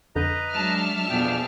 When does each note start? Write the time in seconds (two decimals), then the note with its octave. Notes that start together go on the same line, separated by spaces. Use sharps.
0.16 F2 D3 B4 D#5 A#5 G6
0.52 F#3 G#3 D4 E5 A5 F6
1.10 F2 B2 B3 D4 G#4 G5